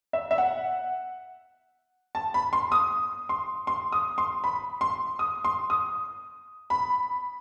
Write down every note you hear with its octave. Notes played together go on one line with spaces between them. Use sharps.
E5
E5
F#5
A5
B5
C6
D#6
C6
C6
D#6
C6
B5
C6
D#6
C6
D#6
B5